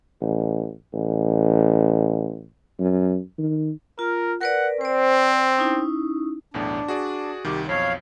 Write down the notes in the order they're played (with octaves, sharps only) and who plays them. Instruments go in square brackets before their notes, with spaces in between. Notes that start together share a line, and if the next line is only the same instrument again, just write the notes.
[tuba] A1
A1
F#2
D#3
[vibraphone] F4 [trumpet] A#4
[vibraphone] A#4 B4 D5 [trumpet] F#5
[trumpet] C4 [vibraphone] C5 D5
[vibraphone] C#4 D#4 E4
[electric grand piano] B1 E2 A2 [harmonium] D4
[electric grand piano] F#4 G#4 D5
[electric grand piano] C2 D#3 [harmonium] G4
[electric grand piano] B1 F2 [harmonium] C#5 F5